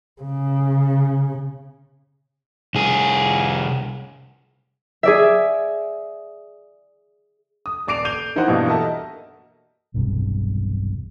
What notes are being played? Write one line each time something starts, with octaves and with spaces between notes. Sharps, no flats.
C#3
C2 G#4
G#4 D5 E5
D#6
D#1 D5 D6 C7 D7 F7
G6 D#7 F7 G7
E3 D#4 E4 C5 F#5
G2 B2 E3 A#3 D4
F#4 A4 A#4 D#5 E5 A5
E1 B1 G2 C3